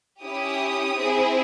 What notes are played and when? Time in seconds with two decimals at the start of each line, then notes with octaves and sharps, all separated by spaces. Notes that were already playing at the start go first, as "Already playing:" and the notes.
0.22 C#4 E4 G4 D#6
0.95 C4 E4 G#4